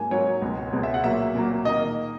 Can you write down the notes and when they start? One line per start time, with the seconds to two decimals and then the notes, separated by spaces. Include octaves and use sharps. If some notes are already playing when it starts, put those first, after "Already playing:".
Already playing: G#2 F#3 A#3 G#5
0.11 G#2 F#3 A#3 C#5
0.42 C#2 B2 G#3
0.73 C#2 B2 G#3
0.83 E5
0.94 F#5
1.03 A#2 F#3 A#3 E5
1.35 A#2 F#3 A#3
1.65 D#3 A#3 D#5